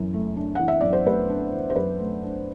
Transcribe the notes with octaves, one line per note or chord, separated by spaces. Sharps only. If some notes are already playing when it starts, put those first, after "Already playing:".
Already playing: F#2 E3
A3
D4
E3 F#5
E5
F#2 D5
C5
A3 B4
D4
E3
C5
F#2 B4
A3
D4